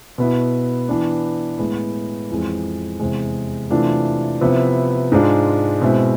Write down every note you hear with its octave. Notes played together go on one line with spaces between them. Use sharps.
B2 B3 E4
E3 B3 D4
A2 G#3 B3
F2 E3 G#3
E2 C3 G#3
C3 E3 A3 D4 F4
C3 F3 B3 E4
G#2 G#3 D4 F4
B2 G#3 C4 E4